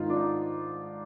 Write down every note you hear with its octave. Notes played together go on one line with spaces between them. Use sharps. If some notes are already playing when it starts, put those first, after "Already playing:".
Already playing: G#2 D#3 D#4 F4
D4
D#4